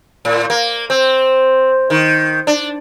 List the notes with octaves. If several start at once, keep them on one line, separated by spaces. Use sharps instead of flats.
A2
A#3
C4
D#3
D4